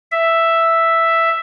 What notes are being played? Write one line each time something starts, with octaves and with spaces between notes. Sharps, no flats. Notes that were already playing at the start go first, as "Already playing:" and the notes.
E5